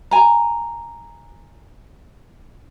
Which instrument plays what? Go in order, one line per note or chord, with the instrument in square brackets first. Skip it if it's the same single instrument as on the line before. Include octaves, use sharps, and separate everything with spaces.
[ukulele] G#5 A#5